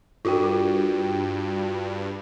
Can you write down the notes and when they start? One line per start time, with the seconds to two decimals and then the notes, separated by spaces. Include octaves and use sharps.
0.25 G2 F4 F#4 G5